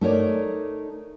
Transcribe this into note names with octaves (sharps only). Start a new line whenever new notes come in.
A3 D#4 A#4 C#5 D5